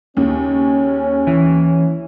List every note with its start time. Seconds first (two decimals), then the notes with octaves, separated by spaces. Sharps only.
0.17 D#2 C#3 C#4
1.27 E3